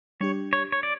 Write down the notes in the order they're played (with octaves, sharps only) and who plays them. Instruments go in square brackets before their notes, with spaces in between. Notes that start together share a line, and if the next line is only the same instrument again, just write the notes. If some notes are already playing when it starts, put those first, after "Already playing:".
[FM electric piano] G3 D4 G4 [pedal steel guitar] C#5
[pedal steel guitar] C#5
C#5
D5